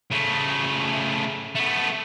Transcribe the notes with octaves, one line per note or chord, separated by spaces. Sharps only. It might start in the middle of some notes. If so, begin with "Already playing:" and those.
C#3 A3
A3 B3